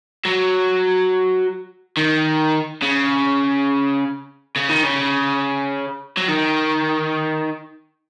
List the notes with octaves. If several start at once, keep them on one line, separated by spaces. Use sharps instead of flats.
F#3
D#3
C#3
C#3
D#3
C#3
F#3
D#3